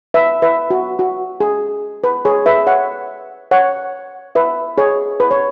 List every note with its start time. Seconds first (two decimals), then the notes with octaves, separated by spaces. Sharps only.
0.14 B4 E5
0.42 B4 E5
0.70 F#4
0.99 F#4
1.40 G#4
2.04 B4
2.25 G#4 C#5
2.46 B4 E5
2.67 C#5 F#5
3.51 C#5 F#5
4.35 B4 E5
4.78 G#4 C#5
5.20 B4
5.31 C#5